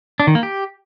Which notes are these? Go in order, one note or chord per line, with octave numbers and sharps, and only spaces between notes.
D4
D#3
A#3
G4